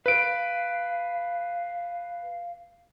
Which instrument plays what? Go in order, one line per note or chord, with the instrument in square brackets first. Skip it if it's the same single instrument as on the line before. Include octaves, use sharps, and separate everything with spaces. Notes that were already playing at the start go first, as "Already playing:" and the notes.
[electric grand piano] B4 D7 [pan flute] F5